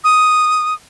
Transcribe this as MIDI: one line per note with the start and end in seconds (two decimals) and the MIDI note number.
0.04 0.74 87